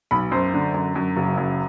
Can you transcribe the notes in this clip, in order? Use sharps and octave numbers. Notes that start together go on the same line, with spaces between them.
B1 B5
F#2 C5
D3
F#2
F#2
F#1
F#2